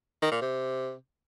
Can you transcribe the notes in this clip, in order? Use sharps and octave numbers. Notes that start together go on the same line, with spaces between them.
D#3
A#2
C3